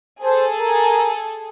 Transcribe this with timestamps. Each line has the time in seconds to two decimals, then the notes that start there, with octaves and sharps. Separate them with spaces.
0.23 G#4 A4 C5
0.59 A#4